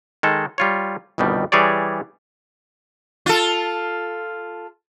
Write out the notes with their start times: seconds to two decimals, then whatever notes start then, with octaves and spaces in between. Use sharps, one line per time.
0.23 D#3 G#3 A4
0.58 G3 F4 C#5
1.18 G1 C2 B2 D#3 G3
1.52 E3 G3 G#4 C#5 D5
3.26 F4 A4